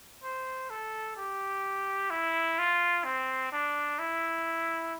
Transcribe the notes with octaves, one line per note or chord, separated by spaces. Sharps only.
C5
A4
G4
E4
F4
C4
D4
E4